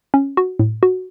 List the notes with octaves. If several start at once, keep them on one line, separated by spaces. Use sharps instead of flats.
C#4
F#4
A2
F#4